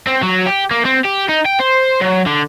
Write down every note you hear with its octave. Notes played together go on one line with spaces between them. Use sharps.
C4
F#3
G4
A#3
C4
G4
D#4
G5
C5
F#3
D3